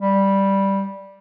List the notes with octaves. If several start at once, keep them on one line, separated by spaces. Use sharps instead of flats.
G3